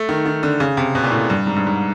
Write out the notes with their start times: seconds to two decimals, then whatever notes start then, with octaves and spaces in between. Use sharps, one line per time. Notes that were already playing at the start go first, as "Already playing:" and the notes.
Already playing: A3
0.09 D#3
0.26 D#3
0.43 D3
0.60 C#3
0.77 C3
0.95 B2
1.03 A#2
1.12 A2
1.30 G2
1.47 G#2
1.56 G2
1.67 G#2